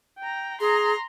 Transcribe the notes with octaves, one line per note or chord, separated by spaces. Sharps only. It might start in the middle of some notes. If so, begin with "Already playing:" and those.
G5 A#5
G#4 A#5 C6